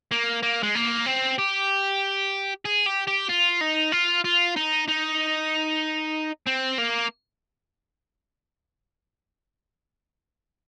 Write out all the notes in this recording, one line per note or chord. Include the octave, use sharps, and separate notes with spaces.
A#3
A#3
G#3
A#3
C4
G4
G#4
G4
G4
F4
D#4
F4
F4
D#4
D#4
C4
A#3